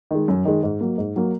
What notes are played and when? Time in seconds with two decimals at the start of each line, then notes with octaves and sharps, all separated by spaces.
0.11 D#3 G#3
0.28 F#2
0.45 D#3 G#3
0.63 G#2
0.81 F#3 A#3
0.98 G#2
1.16 F#3 A#3